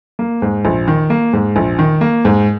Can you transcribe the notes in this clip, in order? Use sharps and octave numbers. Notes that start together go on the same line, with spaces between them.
A#3
G#2
A#1
D#3
A#3
G#2
A#1
D#3
A#3
G#2